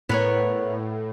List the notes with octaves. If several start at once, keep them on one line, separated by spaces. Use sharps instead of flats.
A2 B3 A#4 C#5